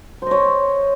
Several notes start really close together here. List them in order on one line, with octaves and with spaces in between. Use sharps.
C5 D#5 C#5